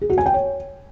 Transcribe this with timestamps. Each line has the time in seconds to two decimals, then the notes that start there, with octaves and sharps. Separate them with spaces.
0.01 G#4
0.10 F#4
0.18 G#5
0.26 G5
0.34 C#5